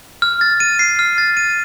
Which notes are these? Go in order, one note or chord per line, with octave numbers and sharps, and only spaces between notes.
F6
A6
D#7
C7
F6
A6
D#7